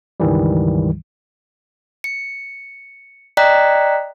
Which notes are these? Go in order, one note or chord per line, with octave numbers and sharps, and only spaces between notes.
C#2 G2 D#3 E3 G3
C#7
D5 D#5 G5 A#5 F#6 B6